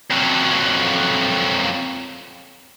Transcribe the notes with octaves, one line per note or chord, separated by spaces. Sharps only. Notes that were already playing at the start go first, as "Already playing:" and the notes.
F2 F#3